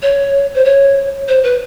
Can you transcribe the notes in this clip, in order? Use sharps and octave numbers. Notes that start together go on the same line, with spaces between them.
C#5
C5
C#5
C5
B4